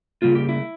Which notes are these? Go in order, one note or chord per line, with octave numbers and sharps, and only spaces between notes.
C#3 G3 A#3 F4
G4
E4